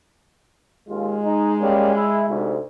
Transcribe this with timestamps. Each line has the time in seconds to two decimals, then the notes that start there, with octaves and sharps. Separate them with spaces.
0.89 D#2 G#3 F4
1.24 D#4
1.60 G3 A#3 C#4
1.95 E4
2.29 D2 G#2 C3